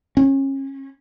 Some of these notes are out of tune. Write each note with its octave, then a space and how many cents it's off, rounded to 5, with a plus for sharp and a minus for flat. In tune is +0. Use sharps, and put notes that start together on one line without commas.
C#4 -30